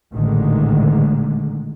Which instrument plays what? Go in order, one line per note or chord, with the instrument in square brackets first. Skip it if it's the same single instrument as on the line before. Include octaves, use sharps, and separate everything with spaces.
[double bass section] A1 A#2 D3 D#3 G#3